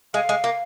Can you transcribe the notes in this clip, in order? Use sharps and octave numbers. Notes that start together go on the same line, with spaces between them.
G#3 F5
G#3
A#3